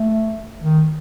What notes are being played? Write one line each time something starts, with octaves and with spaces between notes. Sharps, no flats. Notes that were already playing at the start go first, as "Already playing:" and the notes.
Already playing: A3
D#3